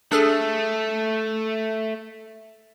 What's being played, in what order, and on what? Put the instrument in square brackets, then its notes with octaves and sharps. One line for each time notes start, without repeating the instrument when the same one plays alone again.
[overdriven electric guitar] A3 [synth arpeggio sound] D4 G#4 A4